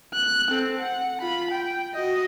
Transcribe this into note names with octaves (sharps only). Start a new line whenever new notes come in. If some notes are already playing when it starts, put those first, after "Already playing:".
F#6
C4 A4
F#5
F4 B5
G5
F#4 D#5